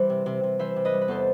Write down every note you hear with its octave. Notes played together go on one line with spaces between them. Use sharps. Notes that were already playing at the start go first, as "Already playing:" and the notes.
Already playing: E3 G3 C5 E5
C3
C3
C3
E3 C5 E5
C3
B4 D#5
G3
B4
E2 A4 C5